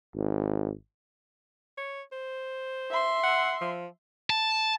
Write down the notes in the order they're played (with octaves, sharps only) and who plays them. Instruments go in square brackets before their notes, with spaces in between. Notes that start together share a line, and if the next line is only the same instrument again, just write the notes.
[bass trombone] G#1
[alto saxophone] C#5
C5
[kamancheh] E5 C6
[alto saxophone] F#5
F3
[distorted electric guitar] A5